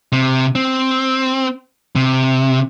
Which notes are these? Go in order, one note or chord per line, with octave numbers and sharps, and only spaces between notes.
C3
C4
C3